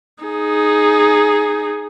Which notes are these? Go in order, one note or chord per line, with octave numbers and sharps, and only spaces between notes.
D#4 G#4